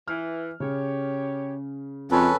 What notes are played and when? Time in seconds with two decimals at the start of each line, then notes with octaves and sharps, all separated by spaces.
0.08 E3 F6
0.60 C#3 G4 C#5
2.11 F2 G#3 C#4 A4 B4 C#5